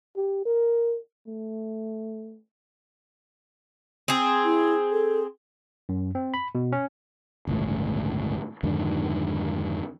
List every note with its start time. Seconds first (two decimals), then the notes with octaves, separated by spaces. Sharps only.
0.16 G4
0.45 A#4
1.27 A3
4.08 C4 G#4
4.44 E4
4.91 A4
5.89 F#2
6.15 C4
6.34 B5
6.55 B2
6.72 C#4
7.47 G1 C#2 A2 E3
8.63 F2 G#2 D3 D#3